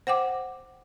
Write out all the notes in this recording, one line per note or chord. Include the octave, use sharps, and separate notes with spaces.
C5 F#5 G5 D6